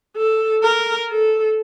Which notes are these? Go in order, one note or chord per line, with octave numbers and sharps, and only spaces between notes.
A4
A#4
A4